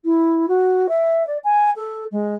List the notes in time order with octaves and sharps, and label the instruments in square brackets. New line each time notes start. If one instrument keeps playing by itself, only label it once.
[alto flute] E4
F#4
E5
D5
G#5
A4
G#3